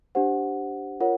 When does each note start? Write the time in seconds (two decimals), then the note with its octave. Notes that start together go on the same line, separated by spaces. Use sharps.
0.15 D4 G4 C5 F#5
1.00 F4 A#4 C#5 F#5